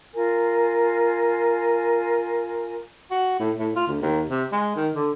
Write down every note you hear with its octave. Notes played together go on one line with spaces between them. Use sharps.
F4 A#4 G#5
F#4
A2
A2
F4
D2
D#2
C3
G#3
D#3
D3